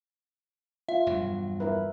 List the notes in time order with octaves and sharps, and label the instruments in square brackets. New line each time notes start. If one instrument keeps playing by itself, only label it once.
[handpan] F4 [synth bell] E5
[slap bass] E1 G2 F#3
[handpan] E4 A#4 B4